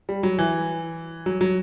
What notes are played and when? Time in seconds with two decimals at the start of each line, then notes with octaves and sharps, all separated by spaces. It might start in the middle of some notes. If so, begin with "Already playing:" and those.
0.09 G3
0.23 F#3
0.38 E3
1.26 F#3
1.41 F#3